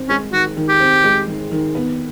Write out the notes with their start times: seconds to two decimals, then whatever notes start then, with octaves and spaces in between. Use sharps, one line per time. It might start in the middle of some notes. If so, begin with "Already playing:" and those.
Already playing: D#3 C4
0.09 G#3 C#4
0.32 D#3 F#4
0.57 D#3
0.69 G4
0.80 C4
1.04 G#3
1.28 D#3
1.52 D#3
1.75 B3